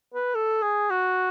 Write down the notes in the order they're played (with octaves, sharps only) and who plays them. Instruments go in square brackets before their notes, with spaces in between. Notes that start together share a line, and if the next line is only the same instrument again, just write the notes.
[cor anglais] B4
A4
G#4
F#4